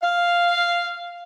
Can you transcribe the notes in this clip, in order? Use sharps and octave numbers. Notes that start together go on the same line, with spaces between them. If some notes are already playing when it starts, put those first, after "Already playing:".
F5